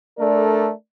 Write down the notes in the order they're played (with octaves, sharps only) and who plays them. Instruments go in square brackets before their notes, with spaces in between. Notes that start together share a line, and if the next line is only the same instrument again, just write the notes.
[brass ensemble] A3 D4 A4 A#4 D5